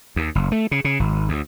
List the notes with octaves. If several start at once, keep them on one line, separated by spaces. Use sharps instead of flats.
D#2
F#1
A3
C#3
C#3
G#1
D2